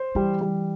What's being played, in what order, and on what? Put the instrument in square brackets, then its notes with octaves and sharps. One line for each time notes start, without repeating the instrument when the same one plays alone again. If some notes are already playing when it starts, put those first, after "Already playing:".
Already playing: [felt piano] C5
[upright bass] E3 [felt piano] G3
[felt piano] G3